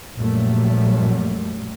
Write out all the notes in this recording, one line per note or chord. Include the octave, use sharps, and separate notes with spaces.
A#1 F#2 A#2 F#3 G3 A3